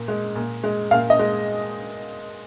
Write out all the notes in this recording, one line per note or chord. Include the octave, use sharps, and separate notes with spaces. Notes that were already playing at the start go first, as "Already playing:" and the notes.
Already playing: A#2
G#3
A#2
G#3
A#2 F5
D#5
G#3